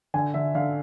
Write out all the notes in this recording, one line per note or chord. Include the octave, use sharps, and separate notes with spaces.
D3 G#5
D3 E5
D3 F5